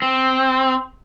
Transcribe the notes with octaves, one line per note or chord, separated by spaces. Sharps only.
C4